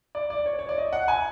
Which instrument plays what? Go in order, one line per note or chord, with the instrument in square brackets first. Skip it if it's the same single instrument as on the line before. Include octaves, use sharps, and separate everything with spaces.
[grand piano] D5
D5
C#5
C#5
D5
D#5
F#5
G#5